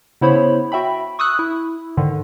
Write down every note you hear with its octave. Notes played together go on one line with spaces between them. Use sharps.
C#3 B3 E4 C5 C#5 B5
F#4 E5 G5 B5
C#6 D#6 E6 F#6
E4
G#2 D3 D#3